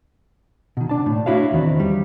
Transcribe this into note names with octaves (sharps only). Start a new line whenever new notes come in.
B2 D#3
D4 A5
A2
D4 E4 F#4 C#5 F5
E2 D#3 C4
G3